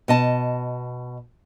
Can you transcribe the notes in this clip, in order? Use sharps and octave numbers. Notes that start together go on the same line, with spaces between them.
B2 D#5 A5